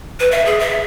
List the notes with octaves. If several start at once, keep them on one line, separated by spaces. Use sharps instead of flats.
B4
E5
G#4
E5